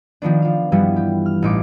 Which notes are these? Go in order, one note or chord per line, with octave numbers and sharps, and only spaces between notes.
D#3 F3 B3 D4
F3 F5
G2 E3 F3 G3 B3 F#4
G4
F6
A1 D#4 D6